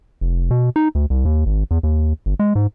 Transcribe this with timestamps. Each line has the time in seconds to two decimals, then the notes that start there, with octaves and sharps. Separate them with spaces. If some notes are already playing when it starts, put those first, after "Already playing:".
0.21 F1
0.51 B2
0.76 D#4
0.95 D2
1.10 C2
1.25 D#2
1.46 G#1
1.71 E2
1.83 D#2
2.26 G1
2.39 G#3
2.55 G#2